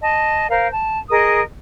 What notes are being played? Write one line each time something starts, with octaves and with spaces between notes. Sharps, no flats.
D#5 A5
A#4 C5 F5
A5
G#4 A#4 D#5 D#6